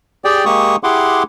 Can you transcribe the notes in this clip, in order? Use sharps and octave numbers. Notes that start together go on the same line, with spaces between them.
G4 G#4 D5 G5
G#3 A#3 G4 C#6 D#6
E4 G4 G#4 F#5 C6 D6